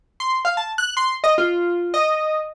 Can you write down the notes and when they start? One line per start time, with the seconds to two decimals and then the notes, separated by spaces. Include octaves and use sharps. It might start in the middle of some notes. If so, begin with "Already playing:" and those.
0.20 C6
0.45 F5
0.57 A5
0.78 F#6
0.97 C6
1.24 D#5
1.38 F4
1.94 D#5